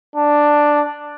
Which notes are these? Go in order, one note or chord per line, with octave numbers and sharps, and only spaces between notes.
D4